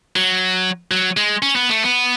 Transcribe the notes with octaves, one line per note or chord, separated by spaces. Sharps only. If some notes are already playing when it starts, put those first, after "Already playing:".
F#3
F#3
G#3
C#4
B3
A3
B3